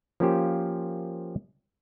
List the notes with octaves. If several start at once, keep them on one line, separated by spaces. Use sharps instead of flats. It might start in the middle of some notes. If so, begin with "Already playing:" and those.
F3 A#3 C#4 F4 G4 C5